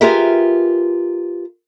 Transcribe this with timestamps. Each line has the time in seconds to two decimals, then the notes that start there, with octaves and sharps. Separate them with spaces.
0.01 F4 G4 G#4 A#4 B4 E5